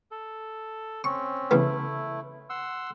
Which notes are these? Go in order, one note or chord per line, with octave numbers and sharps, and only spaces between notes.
A4
C4 C#4 C#6
C#3 E3 A3 B3 E4
F#5 C6 E6